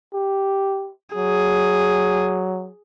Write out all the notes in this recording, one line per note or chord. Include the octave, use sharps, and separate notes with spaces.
G4
F#3 G#4